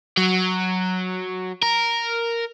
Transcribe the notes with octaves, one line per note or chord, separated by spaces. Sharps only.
F#3
A#4